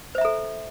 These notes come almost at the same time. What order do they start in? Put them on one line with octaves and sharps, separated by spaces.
C5 E5 A#5 A4